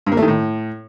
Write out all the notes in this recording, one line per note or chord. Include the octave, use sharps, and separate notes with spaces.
G2
A#3
A3
D#3
A2